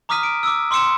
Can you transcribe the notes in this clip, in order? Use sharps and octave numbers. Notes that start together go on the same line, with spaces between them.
A#5 D6 D#6 F6 B6 D#7
D7
D6 E6
C6 D6 E6 C#7 E7